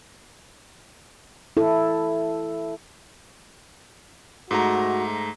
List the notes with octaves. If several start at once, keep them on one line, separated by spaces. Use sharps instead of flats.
E4 A4
G#2 A3 F#4 A#5